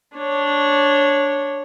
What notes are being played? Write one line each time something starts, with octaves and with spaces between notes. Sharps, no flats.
D4 C#5